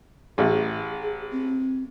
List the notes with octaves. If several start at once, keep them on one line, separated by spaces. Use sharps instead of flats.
A1 G#4
G#4
C4